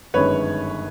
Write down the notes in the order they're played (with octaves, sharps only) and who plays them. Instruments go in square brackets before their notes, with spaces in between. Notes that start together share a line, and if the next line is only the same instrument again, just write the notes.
[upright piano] G1 F#2 D#3 G#3 B4 C#5